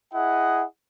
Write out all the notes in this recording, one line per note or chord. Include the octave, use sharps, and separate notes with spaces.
E4 G#4 D#5 F#5